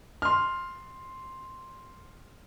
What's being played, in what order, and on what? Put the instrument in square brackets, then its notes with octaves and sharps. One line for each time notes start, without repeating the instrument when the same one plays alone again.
[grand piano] C6 F6